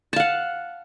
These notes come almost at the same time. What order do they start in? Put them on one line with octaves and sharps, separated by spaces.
A5 F5 F#5